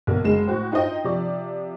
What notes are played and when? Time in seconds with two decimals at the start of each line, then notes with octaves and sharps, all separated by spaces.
0.07 B1 A#3
0.24 F#1 G#3 E7
0.47 A2 F#4 C5 G5
0.72 D#4 F4 C5 D#5 G5
1.04 C3 F3 D5